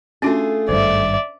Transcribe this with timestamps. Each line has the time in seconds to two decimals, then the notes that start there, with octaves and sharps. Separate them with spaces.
0.22 A3 C#4 D4 F4 F#4 G#4
0.69 G#1 G2 C5 D5 E5